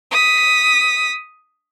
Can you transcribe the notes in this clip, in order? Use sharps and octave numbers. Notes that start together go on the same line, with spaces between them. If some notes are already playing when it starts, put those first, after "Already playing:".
D#6 B6